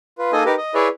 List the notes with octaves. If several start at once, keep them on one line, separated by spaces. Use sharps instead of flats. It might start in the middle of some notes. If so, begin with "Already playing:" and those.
F4 B4
A#3 D#4 A4 D#5 G#5
D#4 G4 A#4 B4
D#5
E4 G#4 B4 C#5 D5 E5